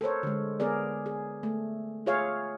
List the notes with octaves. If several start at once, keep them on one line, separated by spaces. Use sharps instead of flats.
A4 A#4 C5 C#5
D3 G#3
B3 G#4 A#4 D5
G#4
A3
F4 G#4 C#5 E5 F5